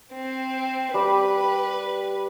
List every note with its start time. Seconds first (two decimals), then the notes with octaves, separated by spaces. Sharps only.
0.13 C4
0.94 G3 B4 B5 D6